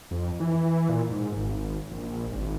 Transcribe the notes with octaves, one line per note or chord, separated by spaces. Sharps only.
F2
E3
A#2
G#2
G#1
A#1
G#1